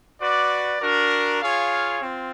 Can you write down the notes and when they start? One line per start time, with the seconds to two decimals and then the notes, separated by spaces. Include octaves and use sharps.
0.20 F#4 B4 D5
0.81 D4 F#4 A#4
1.41 F4 G#4 C#5 F5
2.01 C4 F4